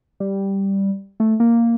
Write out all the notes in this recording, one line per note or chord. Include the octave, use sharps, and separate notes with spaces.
G3
A3
A#3